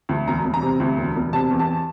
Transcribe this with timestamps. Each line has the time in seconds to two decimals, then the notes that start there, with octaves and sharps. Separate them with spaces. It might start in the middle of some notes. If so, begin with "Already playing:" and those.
0.09 D2
0.27 E1 A#5
0.45 E1
0.54 A#5
0.62 C3
0.80 D2
0.97 E1
1.16 E1
1.33 C3 A5
1.51 E2
1.59 A5